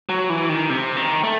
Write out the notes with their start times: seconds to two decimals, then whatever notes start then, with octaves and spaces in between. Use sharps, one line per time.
0.09 F#3
0.30 E3
0.49 D#3
0.70 C3
0.96 D#3
1.23 A3